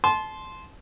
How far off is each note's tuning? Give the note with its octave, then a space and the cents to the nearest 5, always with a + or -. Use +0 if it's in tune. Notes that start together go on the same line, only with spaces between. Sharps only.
A5 -25 C6 +0